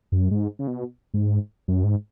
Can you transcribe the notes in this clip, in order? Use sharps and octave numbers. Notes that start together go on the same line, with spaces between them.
F#2
G#2
C#3
B2
G#2
F#2
G#2